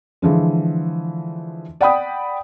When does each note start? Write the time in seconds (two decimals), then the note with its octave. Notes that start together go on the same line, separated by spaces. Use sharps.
0.22 D3 E3 F3 G#3
1.81 D5 F#5 G5 B5 D#6